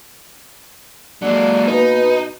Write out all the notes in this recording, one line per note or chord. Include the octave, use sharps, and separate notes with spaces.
F#3 G#3 A#3 D4
B2 D#4 B4